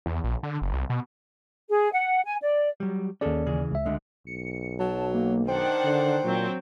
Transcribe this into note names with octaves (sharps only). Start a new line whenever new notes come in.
E2
A#1
D3
F#1
C2
B2
G#4
F#5
G#5
D5
F#3 G3
D#2 C#4 G#4 A4 D5
C#3 E3 G#4
C#2 E5
D2 D3 G#3
B1 C#7
F#3 A5
A#3
D#3 D4 C5 F#5 G5
D3
A#2 F#3 C4